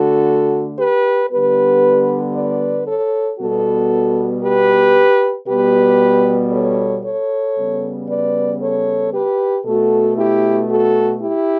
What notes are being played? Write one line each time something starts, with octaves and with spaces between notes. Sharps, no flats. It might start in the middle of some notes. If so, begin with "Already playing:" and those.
Already playing: D3 A3 F#4 A4
G4 B4
D3 G3 B3 G4 B4
B4 D5
A4 C#5
B2 G3 B3 F#4 A4
G4 B4
B2 G3 B3 G4 B4
A4 C#5
A4 C#5
C#3 G3 B3
B4 D5
A4 C#5
G4 B4
B2 A3 F#4 A4
E4 G4
F#4 A4
E4 G4